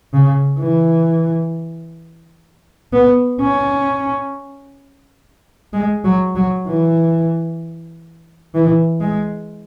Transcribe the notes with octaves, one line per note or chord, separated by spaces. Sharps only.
C#3
E3
B3
C#4
G#3
F#3
F#3
E3
E3
G#3